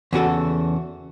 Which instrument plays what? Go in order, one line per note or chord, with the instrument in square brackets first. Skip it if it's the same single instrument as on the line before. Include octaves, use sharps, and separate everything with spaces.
[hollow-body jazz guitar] E2 C#3 F#4 A4